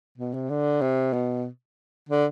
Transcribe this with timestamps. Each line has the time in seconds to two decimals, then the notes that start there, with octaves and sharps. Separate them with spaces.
0.18 B2
0.34 C3
0.50 D3
0.82 C3
1.14 B2
2.09 D3